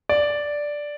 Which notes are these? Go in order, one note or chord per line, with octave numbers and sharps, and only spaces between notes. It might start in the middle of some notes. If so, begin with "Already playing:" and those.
D5